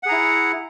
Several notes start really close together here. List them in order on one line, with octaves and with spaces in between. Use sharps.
F#5 G#4 A#5 E4